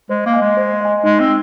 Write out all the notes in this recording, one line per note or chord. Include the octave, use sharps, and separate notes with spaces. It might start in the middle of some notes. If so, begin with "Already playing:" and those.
G#3 C5
A#3
D#5 G#5
G#3
C5
D#5 G#5
G#3 D#4
C4